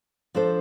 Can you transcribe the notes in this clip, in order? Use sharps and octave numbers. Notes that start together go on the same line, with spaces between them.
F3 D4 A4 C5